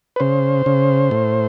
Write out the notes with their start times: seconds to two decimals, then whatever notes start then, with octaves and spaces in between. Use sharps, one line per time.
0.16 B4
0.20 C#3 C5
0.66 C#3
1.11 A2